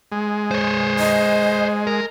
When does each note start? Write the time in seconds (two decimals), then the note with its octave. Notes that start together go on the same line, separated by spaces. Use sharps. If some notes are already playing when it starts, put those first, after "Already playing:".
0.12 G#3
0.51 C5 C#5
0.99 D#5
1.87 A#4